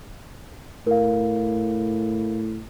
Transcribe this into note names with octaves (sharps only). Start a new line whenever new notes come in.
A2 A#4 F5